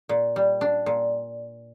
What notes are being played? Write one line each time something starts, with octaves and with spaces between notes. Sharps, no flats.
A#2
G3
D4
A#2